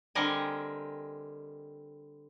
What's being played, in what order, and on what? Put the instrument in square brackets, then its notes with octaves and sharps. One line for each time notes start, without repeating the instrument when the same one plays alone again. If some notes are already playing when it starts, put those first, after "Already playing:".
[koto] D3 G3 C4 A#4 D#5 G#5